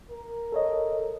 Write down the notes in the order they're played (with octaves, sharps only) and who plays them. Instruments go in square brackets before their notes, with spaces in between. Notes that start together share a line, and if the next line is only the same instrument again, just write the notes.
[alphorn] A#4
[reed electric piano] A4 C#5 D#5